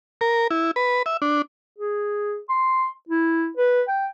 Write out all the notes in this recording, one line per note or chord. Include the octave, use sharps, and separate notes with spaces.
A#4
E4
B4
E5
D4
G#4
C6
E4
B4
G5